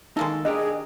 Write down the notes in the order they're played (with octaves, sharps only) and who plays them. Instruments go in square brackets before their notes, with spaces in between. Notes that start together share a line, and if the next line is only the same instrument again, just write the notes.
[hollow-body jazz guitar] D#3 D#4 [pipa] G#3 A#3 A4
[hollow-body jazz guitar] D4 G4 A#4 [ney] G#4 [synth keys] D#5